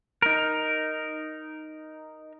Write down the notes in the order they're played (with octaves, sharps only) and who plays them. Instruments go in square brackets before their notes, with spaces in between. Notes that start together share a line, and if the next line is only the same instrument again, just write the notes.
[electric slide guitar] D#4 A#4